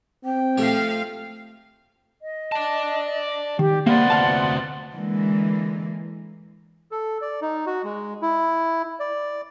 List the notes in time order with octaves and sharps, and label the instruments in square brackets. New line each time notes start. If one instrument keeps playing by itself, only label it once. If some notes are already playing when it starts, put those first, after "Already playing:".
[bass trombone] C4 [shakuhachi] G5
[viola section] F3 F5 [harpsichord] A3 G4
[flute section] D#5
[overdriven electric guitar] D5 A5
[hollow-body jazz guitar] D#3 [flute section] G4
[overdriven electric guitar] C3 B3 [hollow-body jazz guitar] A#3 [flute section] D5 F#5 C6
[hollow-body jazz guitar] D2 F5 A5
[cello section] D3 E3 G#3 A#3
[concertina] A4
D5
D#4
F#4
G#3
E4
D5